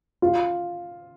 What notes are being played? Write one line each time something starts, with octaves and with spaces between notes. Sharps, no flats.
F4